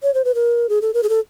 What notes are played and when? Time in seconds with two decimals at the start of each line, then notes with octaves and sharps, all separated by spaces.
0.03 C#5
0.14 C5
0.25 B4
0.35 A#4
0.69 G#4
0.82 A4
0.94 A#4
1.03 G#4
1.09 A4